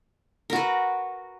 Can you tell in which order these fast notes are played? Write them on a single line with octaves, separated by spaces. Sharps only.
A#4 F#4 B4